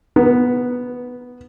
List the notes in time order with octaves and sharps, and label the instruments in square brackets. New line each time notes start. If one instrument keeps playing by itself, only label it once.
[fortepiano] B3